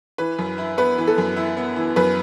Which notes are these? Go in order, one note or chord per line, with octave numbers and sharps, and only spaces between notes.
E3 B4
F#2
E4
B3 B4
E3
A4
F#2
E4
B3
E3
F#2 B4